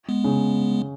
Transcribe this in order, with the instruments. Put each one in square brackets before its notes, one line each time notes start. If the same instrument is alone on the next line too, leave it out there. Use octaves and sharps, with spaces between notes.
[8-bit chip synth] G#3 B3
[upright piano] C#3